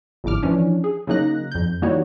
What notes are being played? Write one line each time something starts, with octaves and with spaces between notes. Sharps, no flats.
G1 F2 A2 D6 F6
E3 F3 C#4 D4
G#4
C#3 F#3 A#3 D#4 F#6 A#6
F2 G6
E3 G3 A#3 D#4 F#4 C#5